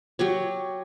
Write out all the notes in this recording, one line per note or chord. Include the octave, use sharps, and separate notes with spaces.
F#3 G4 C#5